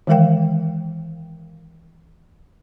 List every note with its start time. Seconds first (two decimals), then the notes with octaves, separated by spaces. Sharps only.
0.07 D#3 E3 G#3 A#4 F5 G5